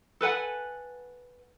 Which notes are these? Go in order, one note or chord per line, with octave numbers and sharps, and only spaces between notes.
A4 B4 F#5 G#5